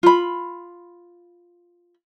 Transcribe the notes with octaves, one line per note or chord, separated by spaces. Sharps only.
F4 B5